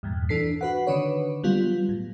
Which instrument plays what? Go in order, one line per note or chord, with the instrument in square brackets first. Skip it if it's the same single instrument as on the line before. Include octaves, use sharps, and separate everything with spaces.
[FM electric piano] E2 G2 A#2
E3 D4 A4 B6 C7
F#4 B4 F#5
D3 D#3 D4 B4 C#5
F#3 G3 B3 F4
A2